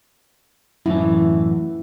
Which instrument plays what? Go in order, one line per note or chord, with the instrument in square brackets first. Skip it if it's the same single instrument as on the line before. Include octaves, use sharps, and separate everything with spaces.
[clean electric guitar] F#2 A2 E3 [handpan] E4